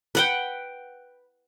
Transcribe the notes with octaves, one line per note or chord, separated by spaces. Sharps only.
B4 F#5 G5